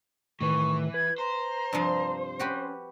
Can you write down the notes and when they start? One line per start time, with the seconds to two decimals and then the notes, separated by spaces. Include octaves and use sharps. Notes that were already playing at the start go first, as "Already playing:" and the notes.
0.41 A2 D#3 E3 B4 C#6
0.94 B4 G#6
1.18 C5 A#5
1.73 G2 C3 F3
2.39 C#4 F#4 G4 B4